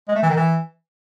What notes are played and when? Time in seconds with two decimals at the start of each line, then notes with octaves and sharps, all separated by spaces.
0.08 G#3
0.15 A3
0.22 E3
0.30 D#3
0.37 E3